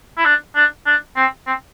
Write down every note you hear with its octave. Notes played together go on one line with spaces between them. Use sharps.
E4
D4
D4
D4
C4
C4